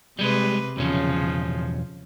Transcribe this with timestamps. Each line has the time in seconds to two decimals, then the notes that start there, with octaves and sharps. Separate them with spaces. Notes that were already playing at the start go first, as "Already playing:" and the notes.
0.19 C3 G3 G#3 B4
0.77 B1 E2 C#3 F3 C#4